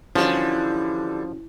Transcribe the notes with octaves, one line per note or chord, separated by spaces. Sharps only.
D3 E3 F3 G3 C#4 F#4